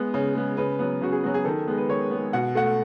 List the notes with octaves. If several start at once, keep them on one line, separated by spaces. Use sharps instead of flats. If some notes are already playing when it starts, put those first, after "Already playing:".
Already playing: G#3 B3
C#3
G#3 B3
C#3 B4
F#3 B3
C#3 F#4
G#4
F#3 B3 F#4
G#4
D#3 A4
G#3 B3
B4
D#3 C#5
B3
G#3
B2 F#5
A3 F#5